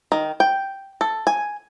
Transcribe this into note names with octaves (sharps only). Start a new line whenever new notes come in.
D#3
G5
A4
G#5